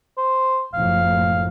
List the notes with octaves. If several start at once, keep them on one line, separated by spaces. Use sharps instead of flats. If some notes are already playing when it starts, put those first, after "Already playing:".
C5
F#1 F2 A2 F5